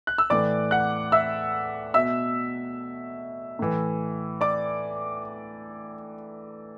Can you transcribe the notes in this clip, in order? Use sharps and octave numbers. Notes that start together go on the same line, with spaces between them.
F#6
E6
A2 E3 D5 D6
F#5 F#6
E5 E6
B2 E5 E6
A2 E3
D5 D6